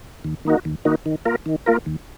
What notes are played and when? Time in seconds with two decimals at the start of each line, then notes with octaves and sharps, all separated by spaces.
0.24 D#2
0.45 D#3 A#3 D#4 F#4
0.65 D#2
0.85 D#3 A#3 D#4 F#4
1.06 D#3
1.26 A#3 F4 A#4
1.46 D#3
1.66 A#3 F4 A#4
1.86 D#2